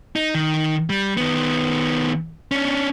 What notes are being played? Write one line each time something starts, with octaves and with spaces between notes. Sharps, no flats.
D#4
D#3
G3
D#3 B3
C#4 D4